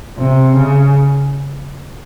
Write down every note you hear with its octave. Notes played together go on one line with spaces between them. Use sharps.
C3
C#3